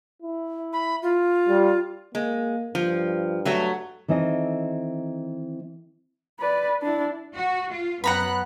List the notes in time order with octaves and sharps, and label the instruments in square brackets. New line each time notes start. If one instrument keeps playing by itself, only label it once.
[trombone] E4
[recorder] B5
F4
[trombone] G3
[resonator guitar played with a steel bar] G#3 [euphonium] A#3
[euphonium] G2 [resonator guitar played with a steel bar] F3
[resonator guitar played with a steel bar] F#3 A3 F#4
[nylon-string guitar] D#3 E3 C4 A4 D#5
[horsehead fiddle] B4 D5
D4 E4
[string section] F#4
F4
[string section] F#2 F#6 [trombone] B3 [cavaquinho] F#5 A#5 B5